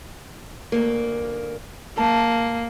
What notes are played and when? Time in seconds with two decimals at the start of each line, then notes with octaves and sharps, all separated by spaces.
0.72 D2 A#3
1.98 A#3 A5